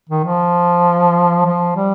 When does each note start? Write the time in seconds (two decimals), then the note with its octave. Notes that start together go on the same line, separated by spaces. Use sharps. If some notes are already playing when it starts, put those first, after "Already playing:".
0.09 D#3
0.24 F3
1.46 F3
1.76 G3